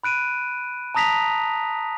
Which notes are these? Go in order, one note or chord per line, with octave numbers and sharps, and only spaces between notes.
B5 F#6 D7 D#7
A5 A#5 D#6 A#6 B6 F7